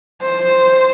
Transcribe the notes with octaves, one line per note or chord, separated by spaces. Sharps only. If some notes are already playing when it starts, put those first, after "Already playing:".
C5